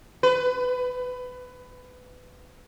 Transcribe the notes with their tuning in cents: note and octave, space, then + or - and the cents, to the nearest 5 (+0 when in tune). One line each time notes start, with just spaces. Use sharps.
B4 +20